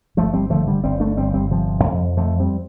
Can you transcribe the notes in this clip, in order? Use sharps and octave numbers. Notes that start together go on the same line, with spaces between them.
G1 F3 A3
G3 C4
D3 F3 A3
D3 G3
G1 G3 C4
A3 D4
G1 G3 C4
G3 C4
C3 F3
F2
F2 F3 A3
G3 C4